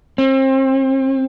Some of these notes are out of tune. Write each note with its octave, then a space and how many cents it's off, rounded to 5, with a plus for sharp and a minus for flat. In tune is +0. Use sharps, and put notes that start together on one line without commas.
C4 +35